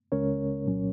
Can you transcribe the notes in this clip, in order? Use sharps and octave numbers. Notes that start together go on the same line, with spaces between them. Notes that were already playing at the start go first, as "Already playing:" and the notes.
C#2 C#3 G#3 C#4 A#4 C#5
C2 A#2 F#3 C#4